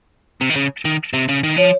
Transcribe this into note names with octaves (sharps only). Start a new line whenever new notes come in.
C3
D#3
C#3
D#3
C3
C#3
D#3
F3 C#5